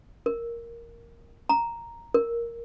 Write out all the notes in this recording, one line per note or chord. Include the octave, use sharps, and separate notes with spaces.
A#4
A#5
A#4